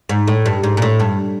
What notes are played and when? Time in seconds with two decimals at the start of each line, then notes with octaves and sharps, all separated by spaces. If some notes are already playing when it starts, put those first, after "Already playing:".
0.09 G#2
0.28 A2
0.46 G2
0.63 G#2
0.77 A#2
0.82 A2
1.00 G2